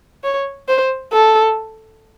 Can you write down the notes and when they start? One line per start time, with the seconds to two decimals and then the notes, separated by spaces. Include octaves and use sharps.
0.24 C#5
0.68 C5
1.13 A4